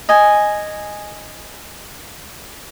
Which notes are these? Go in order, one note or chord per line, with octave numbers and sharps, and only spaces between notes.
D#5 G#5